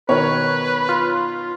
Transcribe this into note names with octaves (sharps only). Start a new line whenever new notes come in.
B2 D#3 A#4 B4 C#5
F4